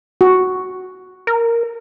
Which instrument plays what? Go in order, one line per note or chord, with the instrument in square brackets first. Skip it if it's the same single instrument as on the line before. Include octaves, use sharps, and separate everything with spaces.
[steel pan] F#4
[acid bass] A#4